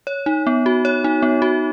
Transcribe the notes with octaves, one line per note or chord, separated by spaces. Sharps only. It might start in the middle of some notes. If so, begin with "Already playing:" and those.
C#5
D#4
B3
F#4
C#5
D#4
B3
F#4